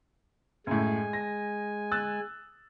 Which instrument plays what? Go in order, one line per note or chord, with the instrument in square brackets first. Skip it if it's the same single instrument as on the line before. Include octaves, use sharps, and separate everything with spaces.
[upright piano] F#2 A2 [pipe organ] G#3 G#5
[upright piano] A#6
E6 F#6 A6